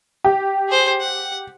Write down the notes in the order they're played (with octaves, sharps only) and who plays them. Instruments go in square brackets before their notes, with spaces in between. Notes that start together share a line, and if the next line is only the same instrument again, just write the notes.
[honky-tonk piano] G4
[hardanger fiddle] G#4 C5
F#5